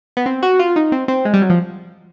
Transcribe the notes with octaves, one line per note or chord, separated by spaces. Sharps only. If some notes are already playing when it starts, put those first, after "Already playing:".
B3
C4
F#4
F4
D#4
C4
C4
G#3
G3
F#3
F3